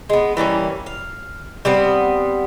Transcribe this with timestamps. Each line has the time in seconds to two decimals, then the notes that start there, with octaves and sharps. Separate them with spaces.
0.09 G#3 B3
0.37 E3 G3 A#3 C#4
0.86 F5
1.65 G3 B3 C4